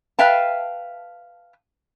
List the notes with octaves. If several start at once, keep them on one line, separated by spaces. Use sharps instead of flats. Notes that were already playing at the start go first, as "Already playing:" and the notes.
B4 E5 F5 G5 A5